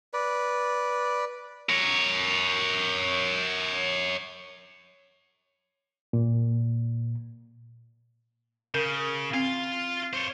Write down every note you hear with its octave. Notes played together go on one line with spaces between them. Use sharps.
B4 D5
A#4 C#5
A#2
C#3 A#4
C4 F4 F5
C5 C#5